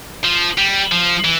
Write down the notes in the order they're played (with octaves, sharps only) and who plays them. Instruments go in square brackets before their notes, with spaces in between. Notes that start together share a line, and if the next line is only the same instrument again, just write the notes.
[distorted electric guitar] F3
G3
F3
E3